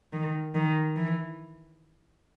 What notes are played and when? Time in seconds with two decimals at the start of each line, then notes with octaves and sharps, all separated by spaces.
0.13 D#3
0.55 D#3
0.96 E3